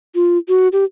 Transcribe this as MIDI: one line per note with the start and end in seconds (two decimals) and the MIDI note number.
0.15 0.38 65
0.49 0.68 66
0.72 0.84 67